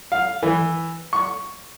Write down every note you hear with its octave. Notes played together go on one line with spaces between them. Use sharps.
F5
E3
C#6